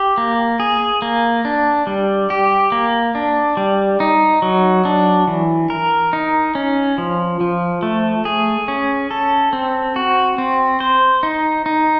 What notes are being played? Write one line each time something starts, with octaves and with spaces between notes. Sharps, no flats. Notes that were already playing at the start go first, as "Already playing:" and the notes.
Already playing: G4
A#3
G#4
A#3
D4
G3
G4
A#3
D4
G3
D#4
F#3
D4
E3
A#4
D#4
C#4
F3
F3
A3
G#4
C#4
A4
C4
F#4
C4
C5
D#4
D#4